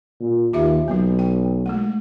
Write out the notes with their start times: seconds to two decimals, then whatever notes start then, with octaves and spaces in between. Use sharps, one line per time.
0.20 A#2
0.53 D#2 F4 G4 E5
0.88 B1 F#3 A#3
1.19 G5
1.66 G#3 A3